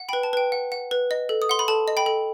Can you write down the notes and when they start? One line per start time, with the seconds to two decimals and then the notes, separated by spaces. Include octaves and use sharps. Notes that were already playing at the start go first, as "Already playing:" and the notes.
Already playing: F#5
0.09 G5 B5
0.13 B4
0.23 A5
0.33 B4 G5
0.52 F#5
0.72 F#5
0.91 B4
1.11 D#5
1.29 A4
1.42 D#6
1.49 F#5 C6
1.59 B5
1.68 A4 A5
1.88 D#5
1.97 G5 B5
2.06 A4